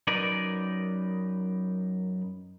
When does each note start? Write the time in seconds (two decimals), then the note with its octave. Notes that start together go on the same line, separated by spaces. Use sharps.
0.07 F#2 D#4 A#4 B4 D5